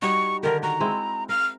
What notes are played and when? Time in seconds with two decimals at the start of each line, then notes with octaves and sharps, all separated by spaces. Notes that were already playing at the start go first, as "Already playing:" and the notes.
0.02 G3 D#4 F#4 C#6
0.43 D3 D#3 G4 A#4
0.63 F#4 A#5
0.80 G#3 C4 E4
1.29 A#4 F6